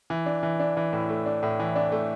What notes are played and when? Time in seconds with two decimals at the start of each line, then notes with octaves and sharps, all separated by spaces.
0.10 E3
0.26 D4
0.43 E3
0.60 D4
0.77 E3
0.93 A2
1.09 A3
1.26 D4
1.43 A2
1.59 E3
1.75 D4
1.92 A3